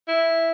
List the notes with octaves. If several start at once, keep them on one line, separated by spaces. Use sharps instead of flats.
E4